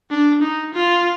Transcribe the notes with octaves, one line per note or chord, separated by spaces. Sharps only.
D4
D#4
F4